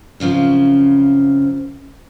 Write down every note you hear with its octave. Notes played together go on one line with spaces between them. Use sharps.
F#2 C#3 F3 C4